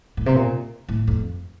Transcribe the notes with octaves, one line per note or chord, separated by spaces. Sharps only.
A2
C3
A#2
A2
F2